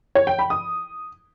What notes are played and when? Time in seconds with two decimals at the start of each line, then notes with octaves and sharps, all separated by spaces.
0.15 C#5
0.27 G5
0.39 B5
0.50 D#6